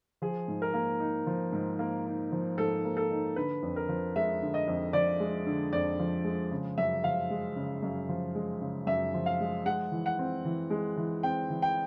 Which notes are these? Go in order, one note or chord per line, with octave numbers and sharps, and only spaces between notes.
F3 G#4
G#2
A#4
A#3
D#4
F3
G#2
A#3
D#4
F3
G#2 A4
A#3
A4
D#4
D3 B4
F2
A#4
F3
G#3 E5
D3
D#5
F2
F3 D5
G#3
D3
F2 D5
F3
G#3
C#3
F#2 E5
F3 F5
G#3
C#3
F#2
F3
G#3
C#3
F#2 E5
F3
F5
G#3
G#3 F#5
E3
F#5
C4
E3
G#3
E3
C4 G5
E3
G5